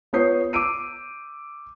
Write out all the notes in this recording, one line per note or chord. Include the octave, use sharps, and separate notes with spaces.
B3 F4 C#5 D#6 G6 C7
D6 E6 D7 D#7